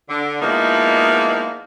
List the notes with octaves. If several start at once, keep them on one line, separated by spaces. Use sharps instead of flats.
D3
F3 G#3 A#3 B3 D#4 E4